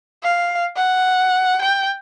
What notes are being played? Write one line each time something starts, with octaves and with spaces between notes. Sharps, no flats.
F5
F#5
G5